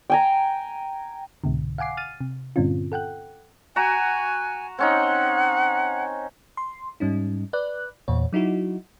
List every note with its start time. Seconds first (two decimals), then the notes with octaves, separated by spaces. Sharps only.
0.10 G5 G#5 A#5
1.44 C2 G#2 B2 D3
1.78 F5 F#5 G#5 D6 C7
1.97 F6 A6 D#7
2.21 C3
2.56 G2 A#2 D3 C4 C#4 F4
2.92 A4 F#5 G5 F#6
3.76 F#4 G#5 A#5
4.79 C4 C#4 D#4 F#5
6.57 C6
7.00 G#2 G3 C#4 D#4
7.53 B4 D5 F#6
8.08 E2 A#2 C#5
8.33 F#3 D#4 E4 F#4